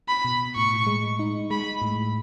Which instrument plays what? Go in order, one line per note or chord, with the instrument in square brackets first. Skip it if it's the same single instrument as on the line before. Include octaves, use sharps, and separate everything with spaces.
[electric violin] B5
[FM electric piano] B2
[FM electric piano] A2 [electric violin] C#6
[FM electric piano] G#3
D#4
[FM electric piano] G#3 [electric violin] B5
[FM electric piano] A2